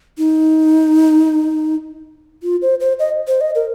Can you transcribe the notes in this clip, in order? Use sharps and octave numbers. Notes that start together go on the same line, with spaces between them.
D#4
F4
C5
C5
D#5
C5
D#5
A#4